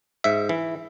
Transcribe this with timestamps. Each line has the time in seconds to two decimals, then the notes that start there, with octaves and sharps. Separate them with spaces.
0.24 G#2 E5
0.49 E3